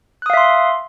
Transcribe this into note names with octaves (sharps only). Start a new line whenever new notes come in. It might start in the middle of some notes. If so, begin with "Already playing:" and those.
E5 F5 C6 D#6 F#6